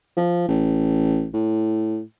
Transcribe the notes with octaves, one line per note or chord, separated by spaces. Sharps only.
F3
A1
A2